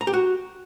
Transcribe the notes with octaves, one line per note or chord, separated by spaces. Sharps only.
A#5
G4
F#4